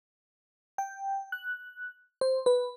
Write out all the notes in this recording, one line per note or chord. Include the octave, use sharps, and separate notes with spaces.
G5
F#6
C5
B4